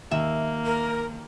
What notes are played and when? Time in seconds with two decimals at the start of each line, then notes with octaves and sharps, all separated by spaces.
0.11 D#2 A#3 E5
0.66 A#4